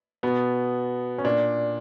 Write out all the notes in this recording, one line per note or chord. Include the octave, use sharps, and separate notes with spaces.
B2 B3
C#4
A#2 D4